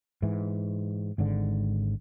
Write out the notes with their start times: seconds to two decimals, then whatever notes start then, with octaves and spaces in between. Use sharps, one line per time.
0.22 G#2 E3
1.18 G#1 G#2 D3